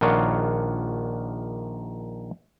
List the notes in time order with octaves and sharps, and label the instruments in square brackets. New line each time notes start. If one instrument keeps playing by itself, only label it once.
[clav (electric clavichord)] A#1 D#3 D4 F4 F#4 C#5